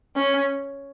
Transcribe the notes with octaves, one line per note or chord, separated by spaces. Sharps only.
C#4